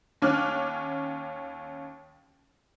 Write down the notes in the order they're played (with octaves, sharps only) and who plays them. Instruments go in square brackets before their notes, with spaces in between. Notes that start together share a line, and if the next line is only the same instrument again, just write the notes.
[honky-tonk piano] D#2 C#4 D6 F6 F#6